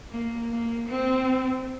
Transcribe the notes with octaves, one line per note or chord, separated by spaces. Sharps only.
A#3
A#3
C4